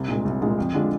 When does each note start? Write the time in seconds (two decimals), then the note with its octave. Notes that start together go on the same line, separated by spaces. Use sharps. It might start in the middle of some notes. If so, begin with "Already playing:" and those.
Already playing: C2
0.08 A#2 G#3
0.25 C2
0.42 A#2 G#3
0.58 F2
0.74 D3 G#3 D4 F4